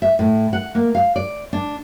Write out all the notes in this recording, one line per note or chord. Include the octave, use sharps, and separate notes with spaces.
E5
A2
F#5
A#3
F5
D5
D4